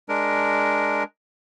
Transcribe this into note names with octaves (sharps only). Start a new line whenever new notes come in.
G#3 D4 A#4